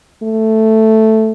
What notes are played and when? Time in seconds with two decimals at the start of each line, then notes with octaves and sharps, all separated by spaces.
0.23 A3